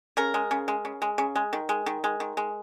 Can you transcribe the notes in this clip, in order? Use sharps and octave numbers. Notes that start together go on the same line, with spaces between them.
C#3 A#4
G#3
C#3
G#3
C#3
G#3
C#3
G#3
D#3
G#3
D#3
G#3
D#3
G#3